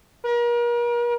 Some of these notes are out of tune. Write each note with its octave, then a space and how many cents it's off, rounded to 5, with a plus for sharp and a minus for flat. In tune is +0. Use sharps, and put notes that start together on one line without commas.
A#4 +40